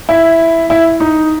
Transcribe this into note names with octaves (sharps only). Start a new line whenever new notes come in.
E4
E4
D#4